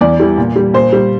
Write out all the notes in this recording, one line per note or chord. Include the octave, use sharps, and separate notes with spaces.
E2 D5
E3 G3
A#2
G3
A#2 C5
G3